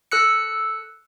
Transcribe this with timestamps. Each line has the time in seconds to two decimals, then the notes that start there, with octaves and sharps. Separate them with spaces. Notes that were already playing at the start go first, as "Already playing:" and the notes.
0.12 A4 E6 F#6 C#7